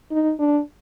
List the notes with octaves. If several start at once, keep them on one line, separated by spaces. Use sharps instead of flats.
D#4
D4